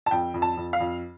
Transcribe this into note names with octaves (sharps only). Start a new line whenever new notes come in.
A5
F2 G5
F2
A5
F2
F5
F2